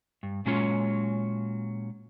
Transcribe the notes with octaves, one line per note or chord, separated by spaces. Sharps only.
G2
A#2 F#3 G#3 C#4 F4 C#5